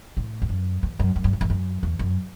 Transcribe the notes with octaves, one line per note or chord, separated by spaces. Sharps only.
A2
E2
F#2
E2
F#2
F#2
G2
F#2
E2
F#2
E2
F#2